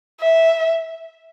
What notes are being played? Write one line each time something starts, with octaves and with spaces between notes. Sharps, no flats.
E5